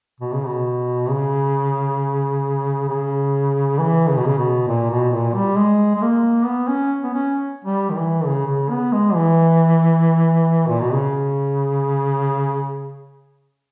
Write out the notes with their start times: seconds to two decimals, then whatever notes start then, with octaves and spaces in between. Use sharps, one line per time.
0.20 B2
0.33 C#3
0.47 B2
1.10 C#3
2.89 C#3
3.79 E3
4.08 C#3
4.17 B2
4.26 C#3
4.38 B2
4.67 A#2
4.90 B2
5.12 A#2
5.35 G3
5.56 G#3
5.95 G#3
6.02 A#3
6.46 B3
6.68 C#4
7.04 B3
7.14 C#4
7.65 G3
7.90 D#3
7.96 E3
8.25 C#3
8.47 C#3
8.70 B3
8.92 G#3
9.15 E3
10.68 A#2
10.80 B2
10.93 C#3